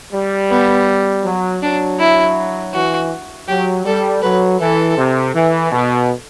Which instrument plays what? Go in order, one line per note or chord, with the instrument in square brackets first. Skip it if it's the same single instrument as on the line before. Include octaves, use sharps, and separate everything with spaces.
[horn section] G3
[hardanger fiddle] B3
[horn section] F#3
[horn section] F#3 [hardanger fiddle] D4
[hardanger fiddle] E4
[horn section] E3 [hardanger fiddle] F#4
[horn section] F#3 [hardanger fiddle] G4
[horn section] G3 [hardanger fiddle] A4
[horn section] F#3 [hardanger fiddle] B4
[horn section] E3 [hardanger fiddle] A4
[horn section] C3
E3
B2